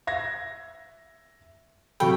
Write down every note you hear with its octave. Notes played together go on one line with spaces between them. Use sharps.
E5 G#6 A#6
C3 F#3 A4 G5 B5 C#6